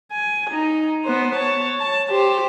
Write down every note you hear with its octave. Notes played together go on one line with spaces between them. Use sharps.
G#5
D#4
B3 C5
C#5 A5
A5
G4 C5